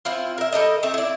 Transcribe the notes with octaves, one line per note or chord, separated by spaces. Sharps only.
C4 E4 F4
A#4 E5
G3 A4 A#4 D#5
A3 C4 E5
E4 D5